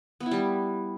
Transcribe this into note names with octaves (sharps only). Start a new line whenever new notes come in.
B3
E4
G3